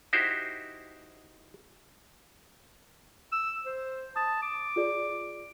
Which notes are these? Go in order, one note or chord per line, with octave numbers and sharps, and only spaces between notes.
D#4 E4 F#4 G4 C5
E6
C5
A5 D#6
D6
F4 G#4 D5